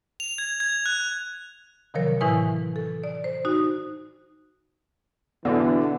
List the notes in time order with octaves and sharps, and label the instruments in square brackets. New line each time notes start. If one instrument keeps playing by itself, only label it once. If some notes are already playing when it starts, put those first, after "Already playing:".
[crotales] F7
G#6
G#6
F#6
[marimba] C3 D#3 F3 F#3 A#4 C#5
A2 E3 E4 B4 G#5 D#6
A4
D5
C5
D#4 F#4
[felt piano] B2 [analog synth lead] D3 [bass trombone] E3